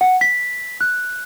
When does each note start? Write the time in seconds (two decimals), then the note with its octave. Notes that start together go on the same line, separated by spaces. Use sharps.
0.01 F#5
0.21 B6
0.81 F#6